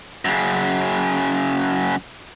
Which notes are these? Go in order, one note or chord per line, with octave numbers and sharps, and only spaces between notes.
F#2 C#3